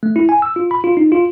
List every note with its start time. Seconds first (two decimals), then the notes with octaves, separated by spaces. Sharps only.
0.03 A3
0.16 E4
0.29 G#5
0.42 E6
0.56 F4
0.71 B5
0.84 F4
0.97 D#4
1.12 F4